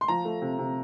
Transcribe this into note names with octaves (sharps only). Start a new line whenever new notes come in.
C6
F3 A#5
A3
C3
C3